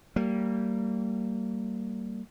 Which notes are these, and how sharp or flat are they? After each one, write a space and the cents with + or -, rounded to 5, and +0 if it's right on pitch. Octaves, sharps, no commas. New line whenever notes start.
G3 -25 A#3 -25